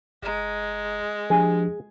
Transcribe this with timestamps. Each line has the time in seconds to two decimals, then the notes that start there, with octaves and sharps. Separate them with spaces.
0.23 G1 G#3 A#5
1.30 F3 D4 G4 G#4